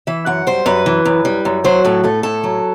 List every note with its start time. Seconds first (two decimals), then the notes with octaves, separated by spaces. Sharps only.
0.07 E3 E5
0.26 F#2 F#5
0.47 G3 C5
0.66 F#2 B4
0.86 E3
1.05 F#2
1.25 G3
1.45 F#2
1.64 F#3 C5
1.85 A2 A4
2.04 A3 A4
2.23 A2 A4
2.44 F#3